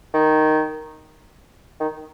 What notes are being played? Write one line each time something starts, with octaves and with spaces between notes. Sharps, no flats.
D#3
D#3